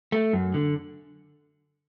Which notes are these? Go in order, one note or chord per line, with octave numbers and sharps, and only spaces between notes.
A3
F#2
D3